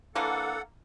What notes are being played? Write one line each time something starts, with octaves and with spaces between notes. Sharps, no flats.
D3 E3 A#3 A4 F#5